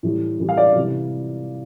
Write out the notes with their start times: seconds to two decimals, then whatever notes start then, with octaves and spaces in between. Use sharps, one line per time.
0.03 A2 E3 G3
0.39 A2 E3 G3
0.49 F5
0.57 D5
0.75 C3 E3 G3